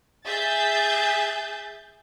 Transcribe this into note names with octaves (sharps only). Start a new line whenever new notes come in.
G#4 E5 G6 A6